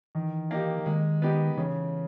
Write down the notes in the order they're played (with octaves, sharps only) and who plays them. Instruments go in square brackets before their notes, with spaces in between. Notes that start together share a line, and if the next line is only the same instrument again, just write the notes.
[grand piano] D#3 [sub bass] E3
[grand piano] A#3 D#4 G4
[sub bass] D#3 [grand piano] G#3
[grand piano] B3 D#4 G4
[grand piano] C#3 [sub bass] E3